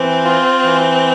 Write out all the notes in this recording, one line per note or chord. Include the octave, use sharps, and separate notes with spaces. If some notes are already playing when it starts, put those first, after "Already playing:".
Already playing: E3 C4
F4
E3